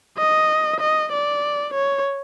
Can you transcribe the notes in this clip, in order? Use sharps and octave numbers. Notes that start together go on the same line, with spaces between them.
D#5
D#5
D5
C#5